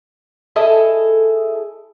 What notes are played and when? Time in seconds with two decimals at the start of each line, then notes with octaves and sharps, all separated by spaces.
0.56 E4 G#4 A4 D#5